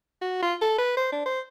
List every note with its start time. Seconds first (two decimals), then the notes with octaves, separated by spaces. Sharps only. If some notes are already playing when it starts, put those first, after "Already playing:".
0.22 F#4
0.42 F4
0.61 A4
0.78 B4
0.97 C5
1.12 D4
1.26 C5